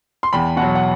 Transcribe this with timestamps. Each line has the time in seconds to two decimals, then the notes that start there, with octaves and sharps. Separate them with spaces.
0.23 C6
0.33 E2 G5 B5
0.57 B2 F#3 F#5 A5
0.75 F#5